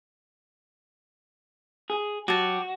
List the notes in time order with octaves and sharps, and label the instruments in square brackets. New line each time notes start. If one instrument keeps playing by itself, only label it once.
[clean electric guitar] G#4
[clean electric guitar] F#3 [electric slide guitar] F#4 [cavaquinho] G4 A5